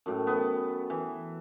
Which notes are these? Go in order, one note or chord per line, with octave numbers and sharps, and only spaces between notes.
F#2 A2 G5
B3
E3